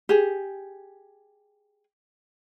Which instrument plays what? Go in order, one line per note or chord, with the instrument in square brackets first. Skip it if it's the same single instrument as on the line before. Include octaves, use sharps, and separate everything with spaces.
[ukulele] G4 G#4